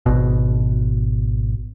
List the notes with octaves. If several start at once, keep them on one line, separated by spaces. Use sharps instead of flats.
G#1 B2